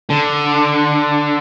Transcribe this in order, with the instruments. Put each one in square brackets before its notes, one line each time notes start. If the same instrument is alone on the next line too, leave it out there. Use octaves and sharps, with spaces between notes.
[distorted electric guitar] D3